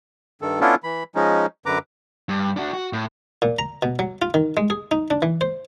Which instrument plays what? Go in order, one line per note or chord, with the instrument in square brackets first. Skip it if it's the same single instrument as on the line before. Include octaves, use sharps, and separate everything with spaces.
[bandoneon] G2 D#3 A4
B3 C#4 D4 E4 F4 A4
E3 B5
F3 G#3 C#4 D#4
F#2 D3 B4 A#5 D6
[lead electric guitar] G2
D4 F#4
F#4
A2
[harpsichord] A#2
A#5
B2
F#3
F4
D#3
G#3
G#4
D#4
D4
E3
C5